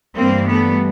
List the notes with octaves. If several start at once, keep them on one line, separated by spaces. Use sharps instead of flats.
G2 E3 G3 A#3 C4
A3 B3